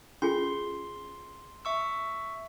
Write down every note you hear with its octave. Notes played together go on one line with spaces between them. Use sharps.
C#4 F4 G#4 C6
E5 C#6 E6